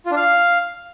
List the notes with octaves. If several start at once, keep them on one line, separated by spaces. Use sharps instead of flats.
F4
D4
F5